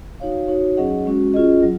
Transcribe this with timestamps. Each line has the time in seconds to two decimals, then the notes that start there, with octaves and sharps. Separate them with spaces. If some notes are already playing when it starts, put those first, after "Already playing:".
0.20 D#4 F#4 C#5 F5
0.48 D#4 F#4 C#5
0.77 F#3 C#4 G#4 D#5 F#5
1.05 G#3 C#4 F#4
1.34 C#4 F4 G#4 D#5
1.62 F#3